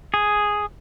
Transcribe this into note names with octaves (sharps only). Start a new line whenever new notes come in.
G#4